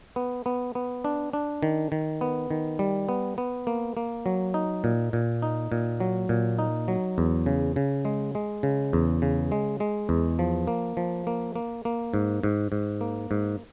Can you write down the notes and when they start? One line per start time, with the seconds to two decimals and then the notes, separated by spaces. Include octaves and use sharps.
0.16 B3
0.46 B3
0.75 B3
1.04 D4
1.33 D4
1.63 D#3
1.92 D#3
2.21 B3
2.51 D#3
2.79 G3
3.09 B3
3.38 B3
3.67 A#3
3.97 A#3
4.26 F#3
4.54 D#4
4.84 A#2
5.13 A#2
5.42 D#4
5.72 A#2
6.00 F#3
6.29 A#2
6.59 D#4
6.88 F#3
7.18 E2
7.46 C#3
7.76 C#3
8.05 G#3
8.35 G#3
8.63 C#3
8.93 E2
9.22 C#3
9.52 G#3
9.80 G#3
10.09 E2
10.39 F3
10.67 A#3
10.97 F3
11.27 A#3
11.56 A#3
11.85 A#3
12.14 G#2
12.43 G#2
12.72 G#2
13.01 A#3
13.31 G#2